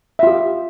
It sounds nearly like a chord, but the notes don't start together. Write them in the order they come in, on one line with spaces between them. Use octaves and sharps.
E5 F4 G4